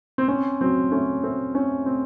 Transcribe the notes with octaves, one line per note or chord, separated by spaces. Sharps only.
C4
C4 C#4
F#3 C4
A3 C#4
A3 C4
C4 C#4
C4